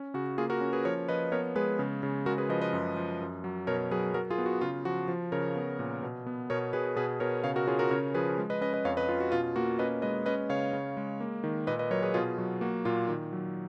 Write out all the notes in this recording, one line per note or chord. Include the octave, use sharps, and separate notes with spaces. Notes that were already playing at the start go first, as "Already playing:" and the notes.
Already playing: C#4
C#3 F#4
A#3 F4 G#4
F#4 A#4
C#4
G#4 B4
F3 A#4 C#5
F3 B4 D#5
B3 A#4 C#5
G#3 G#4 B4
C#3
C#3
G#3 F#4 A#4
G#4 B4
F3 B4 D#5
B4 D#5
F#2
F3
F#2
F#3
B2 A#4 C#5
F#3 G#4 B4
F#3 F#4 A#4
F4 G#4
B3
F#4
C#3 F4
F3 F#4
F3
C#3 A#4 C#5
B3
A#2
B2
B3
B2 A#4 C#5
B2 G#4 B4
B2 G#4 B4
B2 A#4 C#5
C#3 C#5 F5
F#4 A#4
C#4 F4 G#4
F#4 A#4
C#3 A#4 C#5
F3 G#4 B4
G#3
B4 D#5
C#4 B4 D#5
B4 D#5
F2 C#5 F5
B4 D#5
C#4 F4
F#4
B2 F4
A#3 F#4
C#4 B4 D#5
G#3 B4 D#5
C#4 B4 D#5
C#3 C#5 F5
C#3
G#3
A#3
D#3
A#2 B4 D#5
B4 D#5
F#3 A#4 C#5
G#4 B4
B2 F4 G#4
F#3 F#4
A#3 F#4
A#2 F4
D#3
F#3